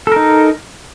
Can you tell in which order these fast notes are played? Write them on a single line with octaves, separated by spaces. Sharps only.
A4 A#4 D#4